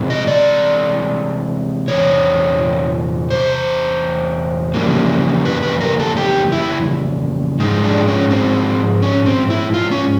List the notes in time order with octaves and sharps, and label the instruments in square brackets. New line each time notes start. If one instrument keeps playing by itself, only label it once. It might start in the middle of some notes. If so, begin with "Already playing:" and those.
Already playing: [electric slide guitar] C3 E3 G#3 C4
D#5
D5
E2 C3 C#5
C5
F2 C#3 E3 G3 A#3
B4
B4
A#4
A4
G4
E4
G#2 F3 G#3 D#4
D4
C#4
C4
C#4
C4
E4
F4
C#4